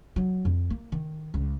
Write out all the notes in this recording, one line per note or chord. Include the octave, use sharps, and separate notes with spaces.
F#3
F2
A#3
D#3
C#2